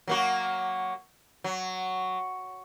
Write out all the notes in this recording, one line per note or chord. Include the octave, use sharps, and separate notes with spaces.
F#3 A#3 F#4
F#3